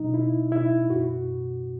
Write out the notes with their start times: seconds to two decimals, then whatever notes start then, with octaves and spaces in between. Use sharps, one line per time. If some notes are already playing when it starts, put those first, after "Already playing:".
Already playing: B2 F#3 D#4
0.14 B2 E4
0.52 B2 E4
0.90 F#2 F#4